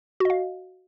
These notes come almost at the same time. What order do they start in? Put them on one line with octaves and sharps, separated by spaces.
F#4 D#5 F5